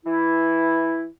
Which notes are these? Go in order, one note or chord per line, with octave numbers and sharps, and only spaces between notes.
E3 E4